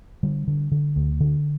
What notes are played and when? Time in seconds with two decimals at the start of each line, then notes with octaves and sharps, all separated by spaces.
0.23 D3 G3
0.47 D3
0.71 D3
0.96 D2
1.20 D3